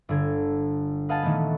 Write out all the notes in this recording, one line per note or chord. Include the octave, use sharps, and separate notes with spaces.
G1 D3 G#6
B4 D#5 F5 F#5 G#5 A5
A#2 D#3 E3 A3 B3